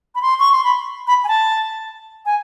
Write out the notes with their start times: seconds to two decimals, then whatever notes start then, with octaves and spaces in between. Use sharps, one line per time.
0.15 B5
0.22 C6
0.39 C#6
0.52 C6
0.64 B5
1.07 B5
1.24 G#5
1.28 A5
2.26 G#5